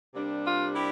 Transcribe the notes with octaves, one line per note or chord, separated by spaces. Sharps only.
C3 G3 A#3 D4
F4
E4 G4